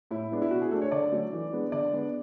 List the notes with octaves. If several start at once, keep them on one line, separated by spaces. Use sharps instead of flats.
A2 E4
G#3 B3 D4
E4
B2 F#4
G#4
A3 D4 A4
C#5
D3 D5
F#3 A3 C#4
E3
G#3 B3 D4
D3 D5
G#3 B3 D4